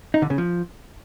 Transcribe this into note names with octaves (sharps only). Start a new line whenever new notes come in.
D#4
D3
C#3
F3